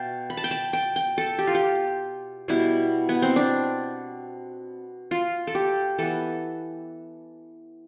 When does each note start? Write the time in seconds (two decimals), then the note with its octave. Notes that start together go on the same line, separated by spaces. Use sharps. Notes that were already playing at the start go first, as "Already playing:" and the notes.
Already playing: B2 F5 G5 A5
0.30 B5
0.37 A5
0.44 G5
0.51 A5
0.73 G5
0.96 G5
1.18 A4
1.38 G4
1.47 F4
1.55 G4
2.48 B2 G3 B3 E4
3.09 B3
3.22 C4
3.36 D4
5.11 F4
5.47 A4
5.55 G4
5.98 E3 B3 A4